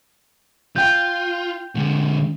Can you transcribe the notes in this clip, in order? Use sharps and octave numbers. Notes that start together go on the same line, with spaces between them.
F4 G5 G6
D3 G#3